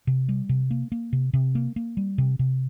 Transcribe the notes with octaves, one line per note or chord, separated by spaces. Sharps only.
C3
G3
C3
A#3
A#3
C3
C3
A#3
A#3
G3
C3
C3